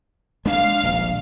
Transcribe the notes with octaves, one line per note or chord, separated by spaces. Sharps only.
G#3 D4 F5
D#1 A#1